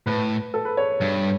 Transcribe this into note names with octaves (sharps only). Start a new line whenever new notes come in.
A2 B4
A4
B4
C#5
G2